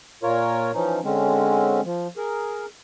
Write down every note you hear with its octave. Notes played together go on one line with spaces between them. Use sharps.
A#2 F4 A#4 C#5
E3 F3 C#4 D#4
D3 G#3 C4 C#4
F3
G#4 A#4